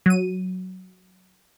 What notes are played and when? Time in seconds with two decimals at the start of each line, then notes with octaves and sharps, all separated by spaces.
0.06 F#3 D#7